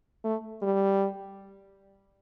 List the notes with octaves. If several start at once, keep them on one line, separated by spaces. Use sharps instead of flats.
A3
G3